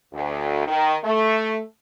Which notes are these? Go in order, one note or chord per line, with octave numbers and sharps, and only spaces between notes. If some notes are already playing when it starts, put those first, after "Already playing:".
D2
D#3
A3